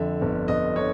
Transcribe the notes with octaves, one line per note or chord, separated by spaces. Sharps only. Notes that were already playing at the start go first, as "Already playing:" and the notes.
Already playing: F2 D3 E5
G1
G1 D#5
D3 C#5